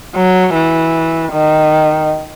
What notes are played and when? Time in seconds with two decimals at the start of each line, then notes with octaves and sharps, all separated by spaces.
0.15 F#3
0.54 E3
1.32 D#3